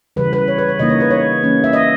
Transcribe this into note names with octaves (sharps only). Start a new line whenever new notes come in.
C#3 E3 G3 B4
B4
C#5
B4
C#5
C#3 E3 A#3 D#4 D#5
C#5
B4
C#5
E3 A#3 C#4
E5
D#5